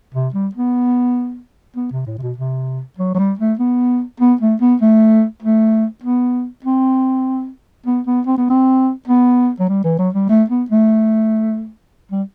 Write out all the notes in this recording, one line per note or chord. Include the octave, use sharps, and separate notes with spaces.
C3
G3
B3
B3
C3
A2
C3
B2
C3
F#3
F#3
G3
A3
B3
B3
A3
B3
A3
A3
B3
C4
B3
B3
C4
B3
C4
B3
F#3
G3
E3
F#3
G3
A3
B3
A3
G3